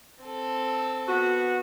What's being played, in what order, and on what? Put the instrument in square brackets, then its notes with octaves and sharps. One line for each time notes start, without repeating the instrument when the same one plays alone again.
[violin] C4 A4
[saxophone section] B3 F#4